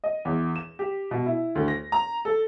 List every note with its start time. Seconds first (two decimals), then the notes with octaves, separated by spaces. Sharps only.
0.04 D#5
0.25 E2
0.56 E7
0.79 G4
1.11 B2
1.26 E4
1.55 D2
1.68 A#6
1.92 A#5
2.25 A4